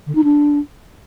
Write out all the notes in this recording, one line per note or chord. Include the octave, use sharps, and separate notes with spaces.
D3
D#4
D4